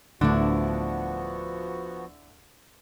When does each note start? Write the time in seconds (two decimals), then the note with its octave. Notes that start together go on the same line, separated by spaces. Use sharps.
0.21 D1 D3 F3 A3 B3 D4 E4 F#4